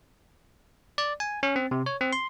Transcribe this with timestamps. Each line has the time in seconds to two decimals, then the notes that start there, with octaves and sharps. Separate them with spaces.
0.98 D5
1.20 G#5
1.43 C#4
1.56 C4
1.71 C3
1.86 C#5
2.01 C4
2.13 C6